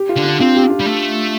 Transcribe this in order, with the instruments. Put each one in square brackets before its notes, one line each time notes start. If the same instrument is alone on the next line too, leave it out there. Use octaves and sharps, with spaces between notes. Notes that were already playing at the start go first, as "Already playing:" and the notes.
Already playing: [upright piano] G4
F4
[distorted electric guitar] D3
[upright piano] D4
[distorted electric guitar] C4 [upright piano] F4
[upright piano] G4
F4
[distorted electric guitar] G3
A3